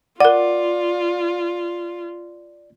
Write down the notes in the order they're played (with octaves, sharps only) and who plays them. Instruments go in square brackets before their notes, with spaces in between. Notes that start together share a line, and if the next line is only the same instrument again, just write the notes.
[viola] F4 [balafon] A#4 F#5 [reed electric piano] D5